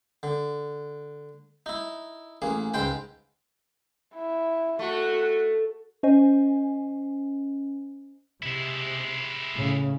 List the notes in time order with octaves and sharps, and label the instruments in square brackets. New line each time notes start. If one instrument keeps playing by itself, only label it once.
[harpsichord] D3
D#4 E4
A1 A#3 G#4
C#2 G#2 B4 C5 G5 B5
[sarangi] E4
[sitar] A3 [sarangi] F#4
[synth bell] C#4 C5 D#5 G#5
[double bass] C3 [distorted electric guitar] G#3 E4
[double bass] A2 C#3